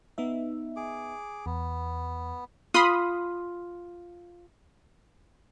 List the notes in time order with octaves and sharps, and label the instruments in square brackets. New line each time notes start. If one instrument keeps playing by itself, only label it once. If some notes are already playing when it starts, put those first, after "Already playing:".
[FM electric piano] B3 D#4 E5
[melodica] G#4 D6
[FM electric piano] E2 [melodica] B3
[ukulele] F4 [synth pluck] B5 C6 D#6